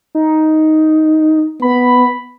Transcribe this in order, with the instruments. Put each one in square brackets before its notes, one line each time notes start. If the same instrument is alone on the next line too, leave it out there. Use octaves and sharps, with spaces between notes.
[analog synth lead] D#4
[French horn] B3 [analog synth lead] B5